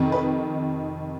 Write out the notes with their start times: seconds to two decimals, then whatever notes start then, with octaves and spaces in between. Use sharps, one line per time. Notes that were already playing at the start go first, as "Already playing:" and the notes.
Already playing: F2 C3 D#3
0.12 B4